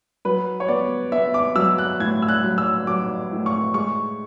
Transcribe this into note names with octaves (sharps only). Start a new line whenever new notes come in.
F#3 B4
C#5
B3 D5
B3 E5
D6
F#3 E6
F#6
A2 G#6
E6
F#6
F#3
E6
F#3 D6
A2
C#6
G#3 C#6